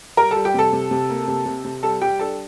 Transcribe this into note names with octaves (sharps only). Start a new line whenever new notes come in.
G3 A#4 A#5
G3 A4 A5
G4 G5
C3 A4 A5
C3
C3
A#3
C3
C3
C3
G3 A4 A5
G3 G4 G5
D4 A4 A5